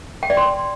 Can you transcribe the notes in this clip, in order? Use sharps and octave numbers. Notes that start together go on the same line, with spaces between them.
G5
D5
C6